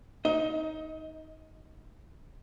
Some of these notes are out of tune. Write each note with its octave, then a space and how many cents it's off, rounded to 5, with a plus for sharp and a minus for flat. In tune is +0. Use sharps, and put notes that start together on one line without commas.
D#4 +10 D#5 +35